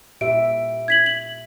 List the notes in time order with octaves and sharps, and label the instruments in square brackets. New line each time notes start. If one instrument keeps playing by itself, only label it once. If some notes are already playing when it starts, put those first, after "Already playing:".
[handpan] A#2 G4 E5 [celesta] D7
[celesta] G#6 B6 F#7
F#7